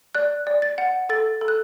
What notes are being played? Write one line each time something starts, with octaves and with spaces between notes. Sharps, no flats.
D5 F#6
D5
A6
F#5
A4 A6
A4
F#6